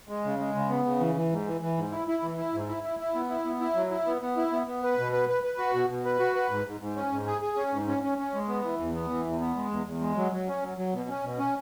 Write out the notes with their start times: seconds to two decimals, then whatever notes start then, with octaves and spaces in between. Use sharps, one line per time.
0.09 G#3
0.24 C#3
0.39 G#3
0.54 C#3
0.69 B3
0.85 C#3
1.00 E3
1.15 E3
1.31 G#2
1.46 E3
1.61 E3
1.77 G#2
1.92 E4
2.08 E4
2.22 E3
2.37 E4
2.54 G#2
2.68 E4
2.83 E4
3.00 E4
3.15 B3
3.30 E4
3.45 B3
3.60 E4
3.75 F#3
3.91 E4
4.06 B3
4.22 B3
4.37 E4
4.52 B3
4.67 B3
4.83 B4
4.98 B2
5.12 B4
5.29 B4
5.43 B4
5.58 F#4
5.73 B2
5.89 B2
6.05 B4
6.19 F#4
6.35 B4
6.50 G#2
6.66 G#2
6.80 G#2
6.96 C#4
7.12 G#2
7.26 G#4
7.41 G#4
7.57 C#4
7.72 G#2
7.88 C#4
8.03 C#4
8.18 C#4
8.34 G#3
8.48 B3
8.63 E3
8.80 E2
8.95 B3
9.10 E3
9.26 E2
9.40 B3
9.56 G#3
9.71 E2
9.86 E2
10.01 G#3
10.17 F#3
10.32 F#3
10.48 C#4
10.62 F#3
10.78 F#3
10.94 B2
11.09 C#4
11.23 B2
11.38 C#4